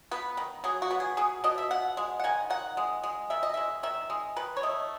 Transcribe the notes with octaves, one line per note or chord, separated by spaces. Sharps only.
B3 B4
D#3
F#3 G#4
F#4
B3
G#4
B2 G#4
B2 D#5
E5
B2 F#5
G#3
F#5
D#3 G#5
D#3 F#5
G#3
G#3
D#3 E5
D#5
G#3 E5
D#3 E5
G#3
D#3 B4
C#5
A3 D#5